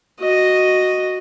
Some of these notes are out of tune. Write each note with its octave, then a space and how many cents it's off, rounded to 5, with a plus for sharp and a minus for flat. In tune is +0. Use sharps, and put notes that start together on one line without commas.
F#4 +0 D#5 -5